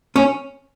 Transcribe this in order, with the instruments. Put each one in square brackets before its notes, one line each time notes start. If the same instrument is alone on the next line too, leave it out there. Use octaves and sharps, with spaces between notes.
[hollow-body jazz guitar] C#4